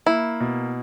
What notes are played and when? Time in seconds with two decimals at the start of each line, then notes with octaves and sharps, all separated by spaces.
0.06 A#3 E4
0.40 B2